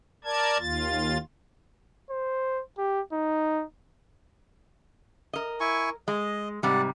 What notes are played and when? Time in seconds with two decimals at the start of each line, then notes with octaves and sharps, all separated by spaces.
0.24 A#4 D5 A5 G#6
0.59 D#2 F4 A6
2.10 C5
2.78 G4
3.12 D#4
5.33 A#4 D#5
5.60 E4 G#5 C#6
6.08 G#3 D#5
6.63 G#2 C3 G3 D5 F#5